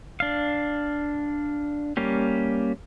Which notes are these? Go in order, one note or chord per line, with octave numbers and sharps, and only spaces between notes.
D4 F5
G3 A#3 C#4 G4